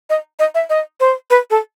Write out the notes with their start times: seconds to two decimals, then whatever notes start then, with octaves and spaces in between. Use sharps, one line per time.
0.10 D#5
0.39 D#5
0.55 E5
0.70 D#5
1.00 C5
1.30 B4
1.51 A4